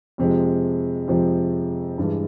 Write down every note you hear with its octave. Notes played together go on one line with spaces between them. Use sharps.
F2 C3 F3 G#3
F2 C3 F3 G#3
G2 E3 G#3